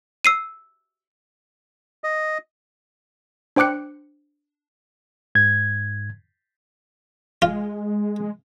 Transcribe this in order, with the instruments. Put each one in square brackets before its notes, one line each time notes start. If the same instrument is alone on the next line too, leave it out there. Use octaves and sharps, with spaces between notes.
[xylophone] E6 C7 D#7
[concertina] D#5
[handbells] D4 C5 G5 D6 F#6 C#7
[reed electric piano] G#2 G#6
[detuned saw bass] G#3 [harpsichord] F4